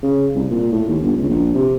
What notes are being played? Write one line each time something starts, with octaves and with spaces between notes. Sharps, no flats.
C#3
C2
A#2
A2
D#2
G1
C#2
A#1
C3